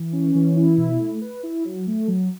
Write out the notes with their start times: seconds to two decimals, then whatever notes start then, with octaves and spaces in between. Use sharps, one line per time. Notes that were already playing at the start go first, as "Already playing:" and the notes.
Already playing: E3
0.13 C#4
0.35 E3
0.56 E4
0.77 B2
0.99 A3
1.21 B4
1.43 E4
1.65 F#3
1.87 A3
2.08 F#3